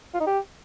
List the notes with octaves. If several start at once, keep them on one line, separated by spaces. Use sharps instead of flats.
F4
D#4
G4